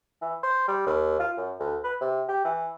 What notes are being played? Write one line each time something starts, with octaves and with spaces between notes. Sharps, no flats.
E3
C5
G3
D#2
F4
F#2
D2
B4
C3
G4
E3